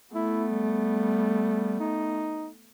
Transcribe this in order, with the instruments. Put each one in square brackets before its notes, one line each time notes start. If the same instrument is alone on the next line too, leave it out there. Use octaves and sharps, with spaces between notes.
[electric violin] A3 B3 [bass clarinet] E4
[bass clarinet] G3
D#4